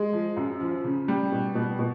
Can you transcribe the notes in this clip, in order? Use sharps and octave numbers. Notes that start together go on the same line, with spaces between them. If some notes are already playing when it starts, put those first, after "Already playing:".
Already playing: G#3
F3
F#2
F3
C#3
G3
B2
B2
B2